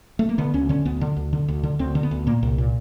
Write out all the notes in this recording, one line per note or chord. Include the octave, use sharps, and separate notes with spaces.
A3
A#3
D3 B3
D2 C#4
D3 C#4
D2 B3
D3
D2
D3
D2
D3
D2 C4
D3
B3
D2
A#2 A#3
C2
A#2